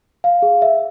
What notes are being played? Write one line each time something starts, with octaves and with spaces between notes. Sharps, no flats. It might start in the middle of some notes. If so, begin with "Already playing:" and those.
F5
G#4
E5